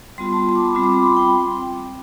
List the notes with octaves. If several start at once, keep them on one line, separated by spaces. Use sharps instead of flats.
G3 B3 F4 C6
A5
C6
D6
B5
G3 C4 F4
D6
C6
B5
G5